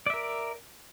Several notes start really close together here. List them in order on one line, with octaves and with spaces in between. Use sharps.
D5 E5 A#4